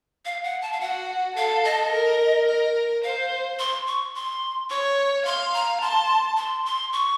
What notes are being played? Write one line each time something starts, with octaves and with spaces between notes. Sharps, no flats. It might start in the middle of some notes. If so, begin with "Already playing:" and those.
F5
F#5
A5
F5
F#4 F#5
A4 F5
D#5
A#4
A#4
C5 F5
C6
C#6
C6
C#5 C#6
F5 C6
A#5
A5 C6
C6
C6
C#6